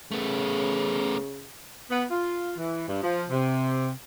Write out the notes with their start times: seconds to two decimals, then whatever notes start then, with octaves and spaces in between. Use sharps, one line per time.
0.11 C#3 A3 B3
1.90 B3
2.11 F4
2.57 E3
2.88 G2
3.02 F3
3.30 C3